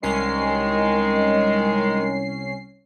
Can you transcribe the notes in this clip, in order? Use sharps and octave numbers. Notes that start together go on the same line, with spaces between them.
C2 D#3 G#3 C#4 C7